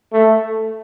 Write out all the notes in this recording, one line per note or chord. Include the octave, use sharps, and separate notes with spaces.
A3